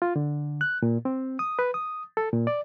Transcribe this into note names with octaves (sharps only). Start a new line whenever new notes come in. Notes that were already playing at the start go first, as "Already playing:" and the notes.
F4
D3
F#6
A#2
C4
D#6
B4
D#6
A4
A#2
D5